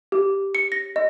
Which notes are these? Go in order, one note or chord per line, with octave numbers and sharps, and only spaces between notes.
G4
C#7
A#6
D#5